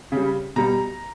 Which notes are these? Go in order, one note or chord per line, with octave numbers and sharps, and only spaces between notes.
C#3 G3
B2 G3 A#5